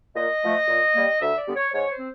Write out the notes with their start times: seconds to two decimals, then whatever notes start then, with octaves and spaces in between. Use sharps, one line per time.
0.15 A#2 D#5
0.42 F3 A3
0.67 A#2
0.94 G3 A#3
1.21 D2 E5
1.38 D5
1.47 D3 G3 B3
1.56 C#5
1.73 G#2 C#5
1.91 C5
1.99 C4